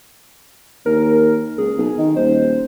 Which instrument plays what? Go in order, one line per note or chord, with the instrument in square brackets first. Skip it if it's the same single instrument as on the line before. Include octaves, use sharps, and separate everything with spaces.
[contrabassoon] D#2 [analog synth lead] A#4
[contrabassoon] C#2 [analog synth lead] G#4
[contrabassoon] B1
D#3
[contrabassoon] D#1 [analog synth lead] C5